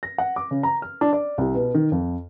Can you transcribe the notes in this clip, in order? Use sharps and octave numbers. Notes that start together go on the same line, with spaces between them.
A#6
F#5
D6
C#3
A#5
F6
D4
D5
C2
B2
D#3
F2